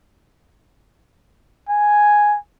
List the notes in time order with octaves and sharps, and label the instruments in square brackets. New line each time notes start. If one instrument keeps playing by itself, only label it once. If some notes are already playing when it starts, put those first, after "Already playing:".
[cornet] G#5